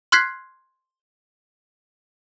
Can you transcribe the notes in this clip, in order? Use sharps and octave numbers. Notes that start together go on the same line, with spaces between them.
C6 F6 F#6 G#6 B6 C7